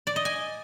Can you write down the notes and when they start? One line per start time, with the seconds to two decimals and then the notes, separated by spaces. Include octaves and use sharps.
0.07 D5
0.16 D#5
0.25 G#5